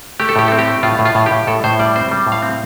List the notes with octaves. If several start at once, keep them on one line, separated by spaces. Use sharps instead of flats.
A3 G4
A4
A2 G4
C4 A4
G4
A3
A2 F4
A2
F4
A2
A2 G4
A2 A4
A2 C5
G3 D5
C4 C5
G3
A2
F5
C4